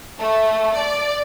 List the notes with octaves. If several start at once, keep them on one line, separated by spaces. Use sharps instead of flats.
A3
D5